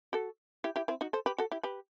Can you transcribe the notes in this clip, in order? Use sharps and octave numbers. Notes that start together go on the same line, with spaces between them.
F#4 A4
E4 G4
E4 G4
C4 E4
D#4 F#4
A4 C5
G4 B4
F#4 A4
E4 G4
G4 B4